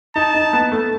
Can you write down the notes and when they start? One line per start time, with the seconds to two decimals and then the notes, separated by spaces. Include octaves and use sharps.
0.15 D#4 A5
0.34 D#4
0.53 B3
0.72 A3